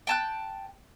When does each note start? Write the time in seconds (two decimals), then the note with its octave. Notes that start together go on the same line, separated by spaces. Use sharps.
0.07 G5 A5 F#6